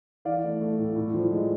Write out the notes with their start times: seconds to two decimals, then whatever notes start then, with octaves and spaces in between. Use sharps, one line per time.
0.25 E3 D5 F5
0.44 A3
0.61 A3
0.78 A2
0.96 A2
1.14 F3
1.31 G#3